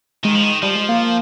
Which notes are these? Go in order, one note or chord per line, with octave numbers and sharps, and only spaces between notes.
D#3 G#3
F3
D#3
F3 G3
G#3
A#3